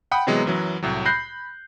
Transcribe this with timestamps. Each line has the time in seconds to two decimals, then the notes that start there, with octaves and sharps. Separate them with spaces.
0.11 F#5 G5 B5 D#6
0.27 C3 E3 F#3 G#3 B3
0.46 F#2 E3 F#3
0.83 C2 A2 F#3
1.05 B5 F#6 G6 A#6 C7